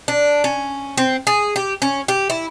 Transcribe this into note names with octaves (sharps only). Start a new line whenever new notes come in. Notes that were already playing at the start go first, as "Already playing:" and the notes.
D4
C#4
C4
G#4
G4
C#4
G4
E4